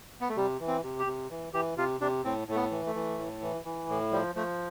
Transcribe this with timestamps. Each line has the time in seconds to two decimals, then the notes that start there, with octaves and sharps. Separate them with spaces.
0.21 B3
0.29 A3
0.36 C3 G3
0.60 E3
0.68 C4
0.83 C3
0.99 G4
1.06 C3
1.30 E3
1.53 E3 G4
1.77 C3 F4
2.00 C3 D4
2.24 A2 C4
2.48 A2 A3
2.55 B3
2.71 E3
2.86 A3
2.95 E3
3.18 A2
3.42 E3
3.65 E3
3.89 A2
4.12 F3 G3
4.35 F3 A3